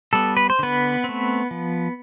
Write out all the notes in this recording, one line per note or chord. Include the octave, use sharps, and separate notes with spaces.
G3 B3 A4
B4
C5
D3 B3 B4
A3 C4
F3